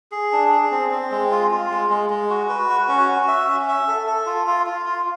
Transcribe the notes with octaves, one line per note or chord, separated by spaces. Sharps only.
G#4
D4
G#4
C4
C4
G#3
F4
F4
G#3
G#3
G#3
F#4
B4
F#4
C#4
F#4
E5
C#4
E5
A4
A4
F4
F4
F4
F4